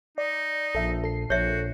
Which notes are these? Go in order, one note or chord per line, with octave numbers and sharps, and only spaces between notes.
D#4 D5
A#1 A4 E5
A4 C7
A#1 F#4 C#5 E5